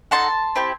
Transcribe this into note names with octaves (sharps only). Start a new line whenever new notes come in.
D#4 F#4 A4 A5 C6
C4 E4 G4